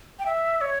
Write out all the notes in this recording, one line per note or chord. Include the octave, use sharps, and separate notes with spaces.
G5
E5
C#5